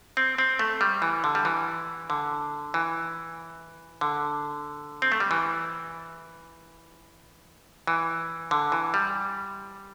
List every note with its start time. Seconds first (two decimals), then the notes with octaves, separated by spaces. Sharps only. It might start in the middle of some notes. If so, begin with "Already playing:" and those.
0.17 C4
0.38 C4
0.59 A3
0.81 G3
1.02 E3
1.24 D3
1.35 G3
1.45 E3
2.10 D3
2.74 E3
4.01 D3
5.02 C4
5.12 A3
5.20 G3
5.31 E3
7.87 E3
8.51 D3
8.72 E3
8.94 G3